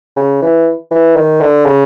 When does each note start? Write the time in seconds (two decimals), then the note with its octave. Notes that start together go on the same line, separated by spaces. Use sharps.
0.16 C#3
0.42 E3
0.91 E3
1.16 D#3
1.40 D3
1.65 C#3